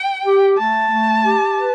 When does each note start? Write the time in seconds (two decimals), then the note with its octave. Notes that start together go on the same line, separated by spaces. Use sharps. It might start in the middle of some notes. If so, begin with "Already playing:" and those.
Already playing: G5
0.24 G4
0.57 A3 A5
0.91 A3
1.24 G4
1.57 B4